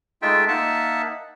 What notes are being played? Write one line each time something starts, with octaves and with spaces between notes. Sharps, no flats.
G#3 A3 D#4 F4 E5 G5
A#3 D#4 E5 F#5 A5